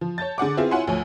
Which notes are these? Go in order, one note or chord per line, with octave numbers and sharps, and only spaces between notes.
F3
C#5 A5 G6 A6
D3 G#4 F#5 D6
B3 C4 E4 F4 G#4 E5
E4 F4 C#5 F#5 G#5 C6
D2 F3 C#5 G#5